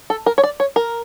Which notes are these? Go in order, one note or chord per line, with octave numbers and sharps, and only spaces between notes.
A4
A#4
C#5
D5
C#5
A#4